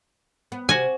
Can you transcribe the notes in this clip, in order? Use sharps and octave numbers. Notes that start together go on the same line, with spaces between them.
B3
C3 F#4 G#5